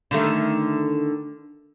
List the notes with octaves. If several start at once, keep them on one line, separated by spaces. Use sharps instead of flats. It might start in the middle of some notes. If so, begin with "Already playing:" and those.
D3 D#3 A3